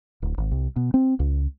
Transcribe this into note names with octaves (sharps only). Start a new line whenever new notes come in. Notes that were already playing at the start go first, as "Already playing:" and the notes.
D1
G#1
C2
B2
C4
C#2